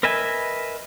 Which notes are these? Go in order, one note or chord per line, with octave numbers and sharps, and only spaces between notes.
A#4 B4 D#5 E5 G#5